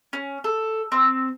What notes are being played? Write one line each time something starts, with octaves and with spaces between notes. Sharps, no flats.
C#4
A4
C4